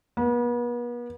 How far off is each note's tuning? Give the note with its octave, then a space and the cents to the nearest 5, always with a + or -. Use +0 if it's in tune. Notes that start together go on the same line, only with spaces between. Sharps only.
B3 -40